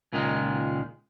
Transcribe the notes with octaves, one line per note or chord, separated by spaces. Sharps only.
C#2 A#2 D#3 G#3